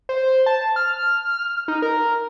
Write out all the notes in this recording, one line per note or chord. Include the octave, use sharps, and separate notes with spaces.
C5
A5
F6
D#4
A#4